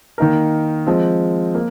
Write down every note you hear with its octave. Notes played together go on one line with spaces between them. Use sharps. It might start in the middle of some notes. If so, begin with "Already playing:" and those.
D#3 A#3 D#4 A#4
F3 G#3 C4
A#3